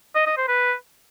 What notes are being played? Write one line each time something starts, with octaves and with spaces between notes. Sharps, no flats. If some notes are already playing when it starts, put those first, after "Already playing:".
D#5
D#5
C5
B4